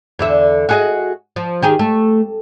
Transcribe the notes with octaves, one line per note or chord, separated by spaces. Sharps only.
E2 D3 E5
F#4 G#4 D#5
F3
D#3 G4 G#4
A3